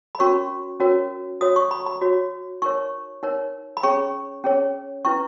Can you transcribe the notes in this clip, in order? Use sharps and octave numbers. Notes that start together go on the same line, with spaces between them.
B5
C#4 F#4 A#4 C#5 C#6
C#4 F#4 A#4 C#5
F#4 C#5 D#6
C#6
B5
B5
F#4 C#5
D#4 A#4 C#5 C#6
D#4 A#4 C#5
B5
C#4 G#4 C#5 C#6
C#4 G#4 C#5
C#4 E4 B4 C#6